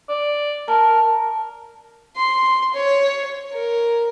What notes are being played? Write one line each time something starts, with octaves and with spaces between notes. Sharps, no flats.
D5
A#4 A5
C6
C#5
A#4